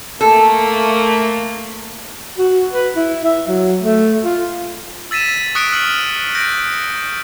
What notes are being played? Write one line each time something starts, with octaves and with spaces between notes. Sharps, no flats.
A3 A#3 A4
F#4
B4
E4
E5
F#3
A3
F4
E6 A6 B6 D#7 E7
C#6 D#6 F#6 B6 C#7 D7
F6 F#7
G6 A#6 D7